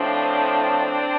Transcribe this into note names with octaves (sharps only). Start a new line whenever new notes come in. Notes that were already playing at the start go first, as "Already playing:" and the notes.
Already playing: A2 F3 C4 D4